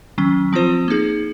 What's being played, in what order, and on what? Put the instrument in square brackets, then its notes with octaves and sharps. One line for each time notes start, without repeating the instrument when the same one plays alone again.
[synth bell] D#3 F#3 C#4
F3 C4 F4 C5
A#3 D#4 G#4